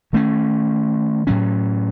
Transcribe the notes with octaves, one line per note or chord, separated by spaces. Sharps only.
D#3 A3 C#4
A2 F#3 C#4